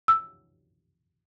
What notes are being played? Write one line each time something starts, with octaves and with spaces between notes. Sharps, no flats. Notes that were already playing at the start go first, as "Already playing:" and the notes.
E6